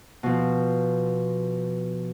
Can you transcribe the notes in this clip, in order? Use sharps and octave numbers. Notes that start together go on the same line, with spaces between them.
B2 F3